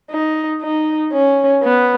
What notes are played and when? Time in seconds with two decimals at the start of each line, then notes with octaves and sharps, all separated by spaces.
0.12 D#4
0.62 D#4
1.13 C#4
1.63 B3